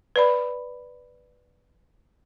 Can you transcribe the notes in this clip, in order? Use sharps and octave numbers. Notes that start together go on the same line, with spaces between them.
B4 D5 B5